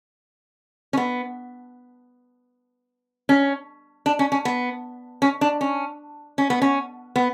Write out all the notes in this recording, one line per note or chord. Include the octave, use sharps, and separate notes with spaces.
C#4
B3
C#4
D4
C#4
C#4
B3
C#4
D4
C#4
C#4
B3
C#4
B3